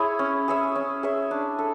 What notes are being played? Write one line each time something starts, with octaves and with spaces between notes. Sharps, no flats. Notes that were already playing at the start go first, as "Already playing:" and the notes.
Already playing: E4 G#4 C#5
C#4
G#4 C#5 E5
C#4
G#4 C#5 E5
D4
A4